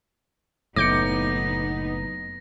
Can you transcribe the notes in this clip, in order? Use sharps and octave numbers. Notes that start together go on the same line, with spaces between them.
F#1 A2 B3 D#4 D6 G6 A#6 C#7